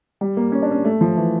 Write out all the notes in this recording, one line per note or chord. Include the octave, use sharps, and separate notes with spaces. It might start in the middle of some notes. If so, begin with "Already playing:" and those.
G3
A#3
C#4
D4
C#4
A3
F3
E3